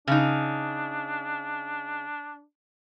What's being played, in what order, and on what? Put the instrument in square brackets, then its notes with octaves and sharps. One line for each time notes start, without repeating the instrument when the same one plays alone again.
[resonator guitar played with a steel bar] C#3 D#4 [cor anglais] D4